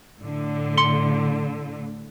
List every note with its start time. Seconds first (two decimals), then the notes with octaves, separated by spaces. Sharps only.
0.21 A2 D3
0.78 C6 C#7 G7